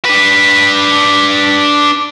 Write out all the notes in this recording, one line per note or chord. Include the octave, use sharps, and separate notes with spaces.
D4 B4